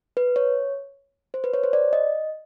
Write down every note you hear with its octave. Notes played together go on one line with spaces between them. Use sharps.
B4
C#5
C5
B4
C#5
C5
D5
D#5